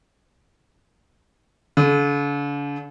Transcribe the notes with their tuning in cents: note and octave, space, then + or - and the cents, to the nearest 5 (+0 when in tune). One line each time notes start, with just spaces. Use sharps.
D3 -45